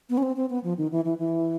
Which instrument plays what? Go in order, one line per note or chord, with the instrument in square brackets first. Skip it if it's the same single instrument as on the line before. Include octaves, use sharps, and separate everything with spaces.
[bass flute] B3
C#4
C4
C4
B3
F3
D#3
E3
E3
E3